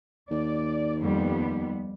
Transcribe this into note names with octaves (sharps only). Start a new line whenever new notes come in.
D#2 D5
F2 G3 B3